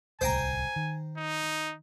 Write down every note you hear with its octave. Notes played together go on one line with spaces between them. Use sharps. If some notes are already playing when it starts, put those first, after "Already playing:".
D1 C2 C5 G5 G#5 A#5
D#3
D#4